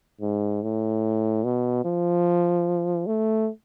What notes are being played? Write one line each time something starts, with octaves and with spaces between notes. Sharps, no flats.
G#2
A2
B2
F3
A3